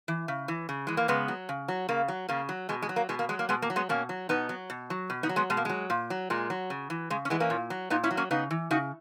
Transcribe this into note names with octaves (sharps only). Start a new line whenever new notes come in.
E3
C#3
E3
C#3
E3 G#3
A#3
C#3 G#3 B3
F#3
C#3
F#3
C#3 A#3
F#3
C#3 A#3
F#3
B2 G#3
G#3
F#3
A#3
B2 G#3
A#3
F#3 G#3
A#3
B2 G#3 B3
A#3
F#3
G#3 B3
B2 A#3 C#4
F#3
B2 B3 D#4
F#3
B2
F#3
B2
B3 D#4
F#3
G#3 B3
B2 G#3
A#3
F#3 G#3
A#2
F#3
A#2 G#3
F#3
C#3
E3
C#3 G#3
C#4
E3 G#3 B3
A#3 C#4
A#2
F#3
A#2 B3 D#4
C#4 E4
F#3
A#3 C#4
C#3 B3 D#4
E3
C#3 D#4 F#4